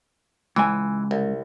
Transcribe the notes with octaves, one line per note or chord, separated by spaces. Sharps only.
C#2 E3 G#3 G#5
C2